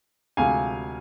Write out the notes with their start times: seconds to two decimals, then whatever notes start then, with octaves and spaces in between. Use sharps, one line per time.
0.37 D2 C3 F3 G#3 F5 G#5